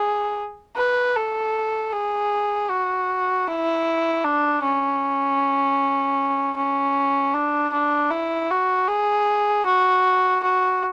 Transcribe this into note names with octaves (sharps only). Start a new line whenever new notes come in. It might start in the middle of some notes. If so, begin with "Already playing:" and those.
Already playing: G#4
B4
A4
G#4
F#4
E4
D4
C#4
C#4
D4
D4
E4
F#4
G#4
F#4
F#4